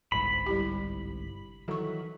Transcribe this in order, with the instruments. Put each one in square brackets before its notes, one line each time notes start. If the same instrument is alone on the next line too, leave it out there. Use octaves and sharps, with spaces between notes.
[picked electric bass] G1 C2 G#2 [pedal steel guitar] B5
[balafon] G3 E4 G4
[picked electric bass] D#3 E3 F#3 [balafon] A4 C#6